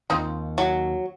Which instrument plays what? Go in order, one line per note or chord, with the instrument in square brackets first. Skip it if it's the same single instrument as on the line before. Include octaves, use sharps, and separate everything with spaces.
[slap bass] D#2 D#3 [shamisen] C4 D#4 F4
[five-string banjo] F#3